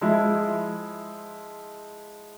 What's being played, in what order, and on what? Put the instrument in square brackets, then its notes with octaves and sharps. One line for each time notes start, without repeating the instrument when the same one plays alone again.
[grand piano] F3 G#3 E4